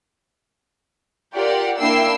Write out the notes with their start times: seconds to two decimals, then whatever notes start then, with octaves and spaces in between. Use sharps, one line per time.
1.35 F4 G4 A#4 D5 F#5
1.79 A#3 D4 E4 G5 E6 C7